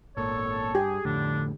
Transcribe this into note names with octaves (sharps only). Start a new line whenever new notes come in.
G#1 A#2 A4 C#5
G2 G4 G#4
F2 A2 D3 D4